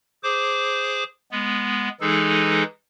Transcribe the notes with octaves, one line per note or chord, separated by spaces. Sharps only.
G#4 C5 D6
G#3 B3
E3 G#3 D#4 G#4 A4